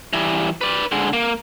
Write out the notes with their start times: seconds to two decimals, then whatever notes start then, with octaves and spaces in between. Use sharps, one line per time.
0.13 E3 G3
0.61 B4 D5
0.92 D3 G#3
1.13 A#3